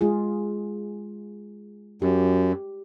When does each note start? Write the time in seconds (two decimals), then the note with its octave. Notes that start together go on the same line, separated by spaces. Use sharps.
0.01 G#3 F4 G#4
2.02 F#2 G4